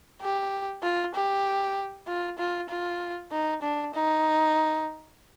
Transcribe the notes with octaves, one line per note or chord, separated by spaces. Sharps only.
G4
F4
G4
F4
F4
F4
D#4
D4
D#4